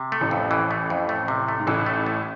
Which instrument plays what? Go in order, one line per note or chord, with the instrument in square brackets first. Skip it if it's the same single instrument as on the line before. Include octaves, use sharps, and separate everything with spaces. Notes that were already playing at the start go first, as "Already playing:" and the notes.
Already playing: [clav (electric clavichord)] C3
A3
[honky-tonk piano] A1 A2
[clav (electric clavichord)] F2
E3
A3
F2
A3
C3
A3
[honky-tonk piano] G#2
[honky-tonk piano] A1 A2 [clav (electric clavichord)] E3
[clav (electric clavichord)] A3
A3